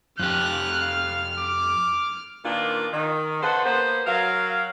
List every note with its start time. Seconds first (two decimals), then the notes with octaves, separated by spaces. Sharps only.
0.19 F2 G4 F6 F#6
0.81 F5
1.39 D6
2.44 A#2 D#3 A#3 B3 D4 F4
2.92 D#3
3.42 C#3 A4 B4 C5 F#5
3.65 A#3 B3 C5
4.06 F#3 A#4 F5